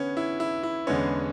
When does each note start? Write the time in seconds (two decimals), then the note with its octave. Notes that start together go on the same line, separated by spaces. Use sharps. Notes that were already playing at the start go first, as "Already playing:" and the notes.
Already playing: D3 B3 C#4
0.17 E4
0.40 E4
0.63 E4
0.87 E2 D3 G#3 B3 C#4